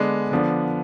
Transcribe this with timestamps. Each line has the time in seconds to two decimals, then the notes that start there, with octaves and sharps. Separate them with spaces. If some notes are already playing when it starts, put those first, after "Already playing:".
Already playing: D3 G#3 B3 D4
0.31 D3 F3 B3 D4